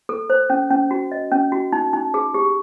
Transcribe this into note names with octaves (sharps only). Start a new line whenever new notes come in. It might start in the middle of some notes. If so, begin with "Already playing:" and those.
A4
C5
C#4
C#4
F#4
D#5
C#4
F#4
D#4
D#4
G#4
G4